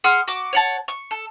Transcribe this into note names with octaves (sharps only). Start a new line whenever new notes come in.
G#4 F#5 C6 F6
F#4 D6
C#5 F#5 A5
C#6
A4